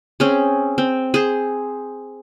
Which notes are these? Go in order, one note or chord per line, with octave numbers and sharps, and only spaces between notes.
C4 C#4 G#4
C4
G#4 C5